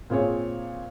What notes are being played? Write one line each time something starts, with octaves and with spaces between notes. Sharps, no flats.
A#2 C4 G#4 C#5